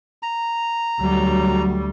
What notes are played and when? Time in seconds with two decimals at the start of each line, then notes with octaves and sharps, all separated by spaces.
0.23 A#5
1.00 D2 F#3 G3